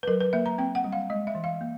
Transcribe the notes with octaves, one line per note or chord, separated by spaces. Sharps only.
B4
F#3 A#4
B4
A#3 E5
A#5
C4 G5
F#5
G3
F5
G#3 D#5
E5
E3
F5
A#3